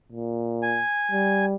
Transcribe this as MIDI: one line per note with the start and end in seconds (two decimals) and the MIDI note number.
0.12 0.82 46
0.63 1.45 80
1.12 1.56 55